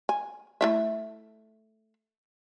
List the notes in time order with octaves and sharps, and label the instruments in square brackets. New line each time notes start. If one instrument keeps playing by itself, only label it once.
[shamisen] G#5
A3 E4 E5